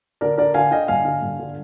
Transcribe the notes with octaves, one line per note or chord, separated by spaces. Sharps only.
D3 A#4 D5
D3 A#4 D5
D3 F5 G#5
D3 D#5 G5
G2 F5 G#5
D3
G2
D3